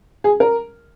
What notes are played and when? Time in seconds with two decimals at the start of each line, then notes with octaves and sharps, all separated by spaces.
0.24 G#4
0.40 A#4